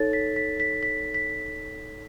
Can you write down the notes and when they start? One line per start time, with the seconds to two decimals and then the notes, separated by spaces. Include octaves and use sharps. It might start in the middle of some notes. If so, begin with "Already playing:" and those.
Already playing: D#4 A4 C#5 A6
0.13 B6
0.36 B6
0.60 B6
0.83 B6
1.14 B6